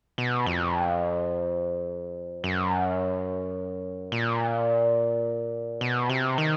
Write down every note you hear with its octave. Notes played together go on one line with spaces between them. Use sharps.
B2
F2
F#2
A#2
B2
C3
D#3